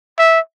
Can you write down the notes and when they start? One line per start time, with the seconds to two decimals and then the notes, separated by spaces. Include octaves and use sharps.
0.18 E5